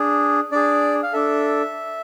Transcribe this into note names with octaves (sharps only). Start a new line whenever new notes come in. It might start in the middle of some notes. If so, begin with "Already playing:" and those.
Already playing: D4 G#4
D4 G#4 D5
F5
D4 A4 E5